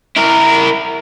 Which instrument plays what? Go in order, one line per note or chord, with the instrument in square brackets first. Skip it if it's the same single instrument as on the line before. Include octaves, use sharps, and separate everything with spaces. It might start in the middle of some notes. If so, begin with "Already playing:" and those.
[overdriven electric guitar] E4 A#4